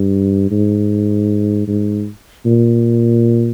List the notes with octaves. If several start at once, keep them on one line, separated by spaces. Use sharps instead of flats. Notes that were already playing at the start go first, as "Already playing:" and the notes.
Already playing: G2
G#2
G#2
A#2